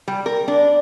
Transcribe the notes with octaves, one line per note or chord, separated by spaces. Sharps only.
G3
A#4
D4